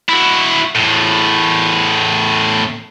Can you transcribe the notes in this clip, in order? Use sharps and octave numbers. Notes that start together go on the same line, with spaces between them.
E4 F#4
E2 A2